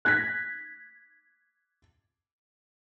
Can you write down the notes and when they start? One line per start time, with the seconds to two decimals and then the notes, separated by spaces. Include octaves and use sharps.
0.05 F#6 G#6 A#6 B6